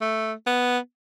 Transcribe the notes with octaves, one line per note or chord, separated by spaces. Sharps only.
A3
B3